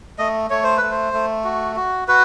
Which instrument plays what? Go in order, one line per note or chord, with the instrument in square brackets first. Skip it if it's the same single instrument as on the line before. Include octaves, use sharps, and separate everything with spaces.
[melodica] A3 D#5
A3 C#5
C5
A3 B4
C5
A3
F#4
F#4
F#4 B4